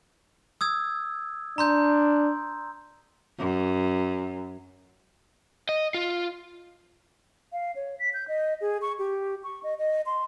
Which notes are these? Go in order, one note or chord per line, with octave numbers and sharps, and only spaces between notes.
D#6 E6 G#6
D4 A#5 C6 G6
F#2
D#5
F4
F5
C#5
B6
G6
D#5
G#4
C#6
G4
C#6
D#5
D#5
C6